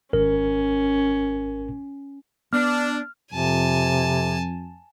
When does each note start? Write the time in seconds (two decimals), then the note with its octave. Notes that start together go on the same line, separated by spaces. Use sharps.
0.13 G#1 C#4 A#4
2.53 B3 D4 F6
3.33 F2 C3 G#5 A5